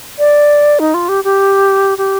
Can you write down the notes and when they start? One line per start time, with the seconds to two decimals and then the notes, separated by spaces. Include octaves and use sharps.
0.19 D5
0.79 D#4
0.94 F4
1.09 G4
1.24 G4
1.98 G4